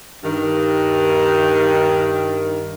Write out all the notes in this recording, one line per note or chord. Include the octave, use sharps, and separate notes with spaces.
G2 D#3